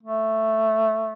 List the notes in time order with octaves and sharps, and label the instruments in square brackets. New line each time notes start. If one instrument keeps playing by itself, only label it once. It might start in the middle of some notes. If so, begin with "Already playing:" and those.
[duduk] A3